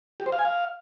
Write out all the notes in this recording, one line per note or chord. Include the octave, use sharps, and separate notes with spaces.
G4
C5
F5
G#5
F5